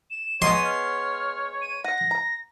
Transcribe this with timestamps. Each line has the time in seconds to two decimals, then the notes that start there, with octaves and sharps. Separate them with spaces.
0.10 E7
0.42 G#3 B3 C#5 D#5 C6 D#7
0.65 F6
1.62 D#7
1.84 F#5 A#6
2.11 A#5